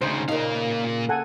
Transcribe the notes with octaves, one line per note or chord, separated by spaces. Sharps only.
D2 C#3 D#4 C5
A#2 C#3 A#3 D#4 F5
A4 F#5 G#5